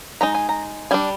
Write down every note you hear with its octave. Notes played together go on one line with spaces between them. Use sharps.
G#3 D#4 A#5
G#5
A#5
G3 D4 G#5